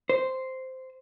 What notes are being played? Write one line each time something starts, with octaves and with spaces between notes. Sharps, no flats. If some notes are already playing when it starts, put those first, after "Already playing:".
C5